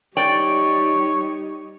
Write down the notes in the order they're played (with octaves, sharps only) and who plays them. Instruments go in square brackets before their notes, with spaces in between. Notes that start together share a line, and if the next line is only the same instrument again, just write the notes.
[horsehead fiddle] G3 D#4 [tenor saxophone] C#5 [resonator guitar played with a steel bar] D5 G5